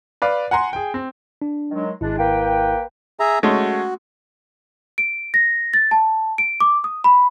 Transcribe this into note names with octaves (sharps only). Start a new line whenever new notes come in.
B4 D5 F5
F#5 G#5 A#5 C6
G#4 G5
C4
D4
D#3 F#3 G#3
G#1 G#3 D4 E4
A#3 B4 G5
G#4 E5 A#5
G#3 A3 C#4 F#4
D7
A#6
A6
A5
D7
D6
D#6
B5